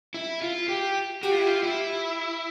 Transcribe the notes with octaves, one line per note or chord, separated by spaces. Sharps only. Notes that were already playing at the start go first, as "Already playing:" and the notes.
E4
F4
G4
F#4 G4
F4
E4
F4
E4